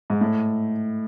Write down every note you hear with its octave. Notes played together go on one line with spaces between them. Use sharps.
G#2
A2